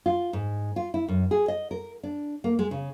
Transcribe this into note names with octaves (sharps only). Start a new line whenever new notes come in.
F4
G#2
F4
E4
F#2
G#4
D#5
A#4
D4
A#3
G#3
C#3